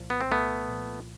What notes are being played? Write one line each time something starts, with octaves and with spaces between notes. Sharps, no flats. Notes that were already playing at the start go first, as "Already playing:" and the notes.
Already playing: C2 A#2 F3
B3
C4
C2 A3 B3
A#2 F3